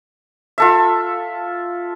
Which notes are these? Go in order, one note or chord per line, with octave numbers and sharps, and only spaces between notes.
F4 A4 E5